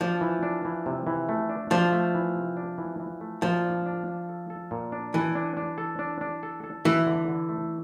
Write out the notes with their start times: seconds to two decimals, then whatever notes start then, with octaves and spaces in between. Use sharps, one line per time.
0.01 F3 D4
0.21 E3
0.43 D4
0.65 E3
0.86 C3
1.07 E3
1.29 A3
1.49 D4
1.71 F3 D4
1.92 A3
2.14 E3
2.36 C3
2.57 D4
2.78 E3
3.00 E3
3.21 A3
3.42 A#2 F3
3.64 D4
3.86 D4
4.07 D4
4.29 A4
4.50 A4
4.71 A#2
4.92 D4
5.14 E3 A4
5.35 D4
5.57 D4
5.78 A4
5.99 D4
6.21 D4
6.43 A4
6.64 A4
6.85 E3 E4
7.07 D3
7.28 D3
7.49 A3